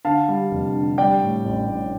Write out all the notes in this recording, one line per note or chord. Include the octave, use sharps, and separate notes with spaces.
D3 F5 A5
G3
F1
D3
G3 D5 G5
A2
A1
A2